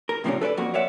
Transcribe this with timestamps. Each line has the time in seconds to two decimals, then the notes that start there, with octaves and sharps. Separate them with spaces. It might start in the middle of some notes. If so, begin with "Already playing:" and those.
0.09 A#4
0.24 A2 C3 F3 A#3 C#4 D4
0.41 A4 B4 C#5 D5
0.57 F2 A#3 F#4
0.74 A#4 C#5 D5 E5 F#5